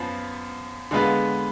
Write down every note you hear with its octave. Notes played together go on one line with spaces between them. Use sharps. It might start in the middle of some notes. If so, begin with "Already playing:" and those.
Already playing: F#2 F3 B3
D3 G#3 B3 F4 B4